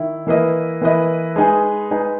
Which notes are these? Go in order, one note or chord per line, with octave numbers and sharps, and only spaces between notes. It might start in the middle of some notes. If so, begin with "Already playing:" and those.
Already playing: D#3 E4
E3 A#3 E4 B4 D#5
E3 A#3 E4 B4 D#5
G#3 D#4 G#4 B4
G#3 D#4 G#4 B4